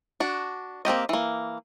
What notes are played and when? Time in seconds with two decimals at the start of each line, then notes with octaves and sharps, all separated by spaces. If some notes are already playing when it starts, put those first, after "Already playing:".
0.20 D4 F#4
0.85 A#3 C4 G4 D#5
1.09 E3 A#3